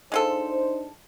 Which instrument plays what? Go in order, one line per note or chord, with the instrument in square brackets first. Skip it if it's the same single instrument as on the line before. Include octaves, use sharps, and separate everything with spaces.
[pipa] G#3 F4 A4 [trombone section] D4 D#4 C5